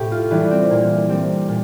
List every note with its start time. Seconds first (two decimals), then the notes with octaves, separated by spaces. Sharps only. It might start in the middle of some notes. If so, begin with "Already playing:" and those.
Already playing: A2 C3 G4 A4
0.12 F4
0.31 E3 G3 D4
0.51 C4
0.70 A#2 A#3
1.09 G3 C4
1.48 A#2